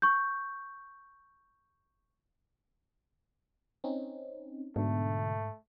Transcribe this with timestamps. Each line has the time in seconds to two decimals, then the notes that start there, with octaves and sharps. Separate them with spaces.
0.02 C#6 G6
3.84 C4 C#4 D#4
4.76 G#2 B2 D3 A3